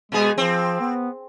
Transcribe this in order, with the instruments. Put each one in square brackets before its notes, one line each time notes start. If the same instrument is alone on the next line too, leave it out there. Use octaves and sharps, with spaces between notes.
[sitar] B2 B3 G#4 [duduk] G#3
[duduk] F3 [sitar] C4
[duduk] B3